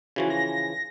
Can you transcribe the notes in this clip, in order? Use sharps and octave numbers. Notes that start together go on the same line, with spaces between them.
C#3 E3 F3 F#4
A#6